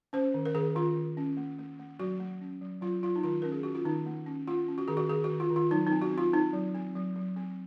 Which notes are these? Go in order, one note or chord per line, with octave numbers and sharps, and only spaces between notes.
C#4 C5
D#3
A#4
D#3 G#4
D#3 F4
D#3
C#4
A#3
A#3
A#3
F#3 F#4
A#3
C#4
F#3
F#3 F4
F#3 F4
D#4
D#3 F4
C#4 A#4
G#4
C#4 F#4
F4
D#3 D#4
A#3
C#4
A#3 F4
C#4
F#4
D#3 G#4
F#4
D#3 G#4
F#4
D#3
F4
D#3
F4
F#3 D#4
C4 D#4
F#4
C4 F4
C4 D#4
F#3
C4
F#3
F#3
C4